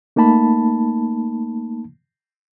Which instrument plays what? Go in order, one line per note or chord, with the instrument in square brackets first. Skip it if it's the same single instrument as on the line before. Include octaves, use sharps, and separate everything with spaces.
[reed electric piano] A3 A#3 D#4 A5 B5